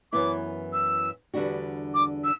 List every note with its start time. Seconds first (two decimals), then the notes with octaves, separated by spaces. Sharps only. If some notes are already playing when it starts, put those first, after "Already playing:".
0.12 F#2 E3 B3 E4 D6
0.73 E6
1.34 E2 D3 G3 D4 F#4
1.94 D6
2.24 E6